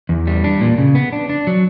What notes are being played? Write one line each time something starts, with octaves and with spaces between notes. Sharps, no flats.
E2
G3
D4
A#2
C#3
B3
D4
D4
F#3